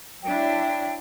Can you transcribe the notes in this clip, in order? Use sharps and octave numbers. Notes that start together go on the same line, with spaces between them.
F#3 D4 E4 G5